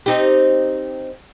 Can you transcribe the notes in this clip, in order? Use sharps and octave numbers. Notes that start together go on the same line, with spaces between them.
C4 D#4 G4